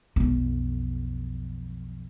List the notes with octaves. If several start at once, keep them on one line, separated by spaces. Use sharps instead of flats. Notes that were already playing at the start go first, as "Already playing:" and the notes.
B1 F2